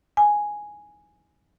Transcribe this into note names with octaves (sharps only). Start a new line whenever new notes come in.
G#5